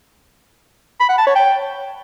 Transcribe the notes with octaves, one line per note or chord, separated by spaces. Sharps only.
B5
F#5
A5
C#5
G5